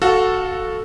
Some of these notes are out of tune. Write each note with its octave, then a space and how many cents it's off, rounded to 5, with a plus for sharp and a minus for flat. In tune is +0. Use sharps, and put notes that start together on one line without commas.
F#4 +0 A4 +0 F5 +25